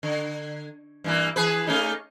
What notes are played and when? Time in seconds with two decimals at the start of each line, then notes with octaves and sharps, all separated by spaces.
0.03 D3
1.04 G2 E3 A#3
1.36 E3 G#4 B4
1.67 A3 C#4 D#4